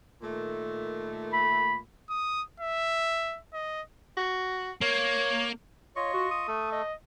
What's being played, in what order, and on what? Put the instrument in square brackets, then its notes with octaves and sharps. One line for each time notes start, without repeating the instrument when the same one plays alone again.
[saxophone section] A#2 D#3 A3
[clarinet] B5
[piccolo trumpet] D#6
E5
D#5
[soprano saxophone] F#4
[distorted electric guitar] A#3 [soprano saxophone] C#5
[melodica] F4 D#5 C#6 [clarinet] C#5
[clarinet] F#4
D#6
[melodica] A3 A4
[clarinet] D#5